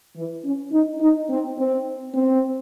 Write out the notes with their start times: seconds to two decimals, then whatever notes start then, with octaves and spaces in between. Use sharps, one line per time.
0.16 E3
0.44 C#4
0.72 D#4
1.00 D#4
1.30 C4
1.58 C4
2.14 C4